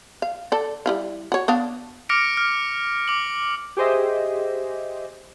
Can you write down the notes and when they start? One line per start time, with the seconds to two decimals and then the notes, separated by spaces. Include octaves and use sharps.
0.22 F5
0.52 A4 D5
0.86 G3 E4 F5
1.32 F#4 C#5
1.48 B3 D4 F5
2.09 D6 F6 A#6 C#7 D7
2.37 F6
3.08 D6 F#7
3.77 G4 G#4 C5 D#5 E5